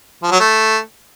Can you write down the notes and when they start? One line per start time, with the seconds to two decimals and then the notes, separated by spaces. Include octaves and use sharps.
0.23 F3
0.31 F#3
0.40 A3